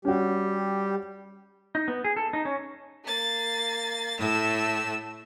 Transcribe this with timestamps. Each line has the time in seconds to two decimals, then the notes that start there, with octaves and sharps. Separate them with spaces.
0.05 G3 C#4 F#4 G4
1.75 D#4
1.88 B3
2.04 G#4
2.17 A4
2.33 D#4
2.45 C#4
3.04 A#3 A6
4.19 A2 A3 E6